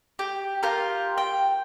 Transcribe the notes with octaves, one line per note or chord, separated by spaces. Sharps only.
G4
F4 G4 A#4
G5